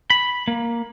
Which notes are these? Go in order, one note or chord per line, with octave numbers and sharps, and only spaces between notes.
B5
A#3